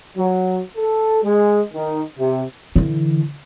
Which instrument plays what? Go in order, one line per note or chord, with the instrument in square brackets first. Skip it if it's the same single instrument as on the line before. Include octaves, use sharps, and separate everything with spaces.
[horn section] F#3
A4
G#3
D#3
C3
[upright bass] D3 E3